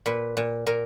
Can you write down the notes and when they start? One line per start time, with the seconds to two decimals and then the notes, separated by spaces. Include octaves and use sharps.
0.06 A#2 B4
0.37 A#2
0.66 A#2 A#4